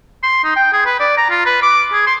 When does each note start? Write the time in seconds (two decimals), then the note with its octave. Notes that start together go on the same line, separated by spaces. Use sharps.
0.23 C6
0.44 D#4
0.56 G5
0.73 G#4
0.85 B4
1.00 D5
1.17 A#5
1.30 F4
1.45 B4
1.63 D6
1.93 G#4
2.07 C6